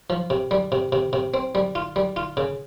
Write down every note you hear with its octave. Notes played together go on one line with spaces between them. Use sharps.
F3
C3
G3
C3
C3
C3
C4
G3
F4
G3
F4
C#3